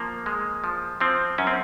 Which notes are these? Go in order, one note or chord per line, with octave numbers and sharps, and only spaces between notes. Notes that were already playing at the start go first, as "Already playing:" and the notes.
Already playing: F3 A#3
G#3
F3
F3 C4
F#2 C#4
C4